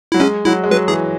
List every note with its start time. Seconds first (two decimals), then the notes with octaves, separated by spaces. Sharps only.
0.12 F#3 E4
0.20 G#3 C#4
0.45 F#3 E4
0.64 G#3
0.71 F#3 B4
0.88 E3 G#4